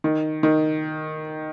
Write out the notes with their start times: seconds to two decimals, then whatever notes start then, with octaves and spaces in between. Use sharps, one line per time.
0.04 D#3
0.43 D#3